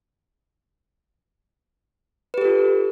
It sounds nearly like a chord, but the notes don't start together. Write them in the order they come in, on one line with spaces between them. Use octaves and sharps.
B4 G4 A4 F4